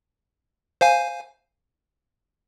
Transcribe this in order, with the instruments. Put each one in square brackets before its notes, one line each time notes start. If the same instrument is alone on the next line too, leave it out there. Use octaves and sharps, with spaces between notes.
[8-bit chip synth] C5 F5 G#5